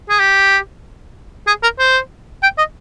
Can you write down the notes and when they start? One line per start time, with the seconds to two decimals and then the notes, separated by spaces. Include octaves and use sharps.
0.09 G#4
0.20 G4
1.47 G#4
1.63 A#4
1.79 C5
2.43 G5
2.58 D#5